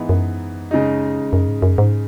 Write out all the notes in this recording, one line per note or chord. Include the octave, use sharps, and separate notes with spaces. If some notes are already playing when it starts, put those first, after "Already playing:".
Already playing: G#2 E3 B3 D#4
F#2
C#3 G#3 D#4
F#2
G#2
F#2
G#2